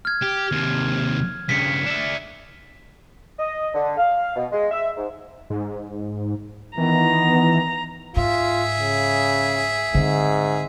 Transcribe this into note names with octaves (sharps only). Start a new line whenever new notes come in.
F6 G#6
G4
D#2 C3
G2 C#3 B6 C#7
D4 E5
D#5
D3
F5
B2
G#3
E5
G#2
G#2
D#3 E3 B3 A#5
G#2 F4 G#4 E5
C#3
G#2 D3 C4